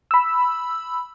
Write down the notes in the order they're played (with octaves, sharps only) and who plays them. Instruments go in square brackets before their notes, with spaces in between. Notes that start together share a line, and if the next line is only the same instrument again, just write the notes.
[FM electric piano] B5 E6